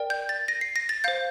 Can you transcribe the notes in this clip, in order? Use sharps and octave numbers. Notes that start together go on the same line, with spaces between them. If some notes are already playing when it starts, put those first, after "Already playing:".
Already playing: A#4 D5 G5
G6
A6
A#6
C7
A#6
A6
C5 F5 G6